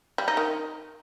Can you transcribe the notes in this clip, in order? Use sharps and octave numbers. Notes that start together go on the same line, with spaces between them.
G3
D#4
D#3